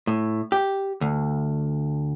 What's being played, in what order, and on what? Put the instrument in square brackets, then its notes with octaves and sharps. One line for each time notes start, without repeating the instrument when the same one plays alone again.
[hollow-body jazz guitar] A2
G4
D2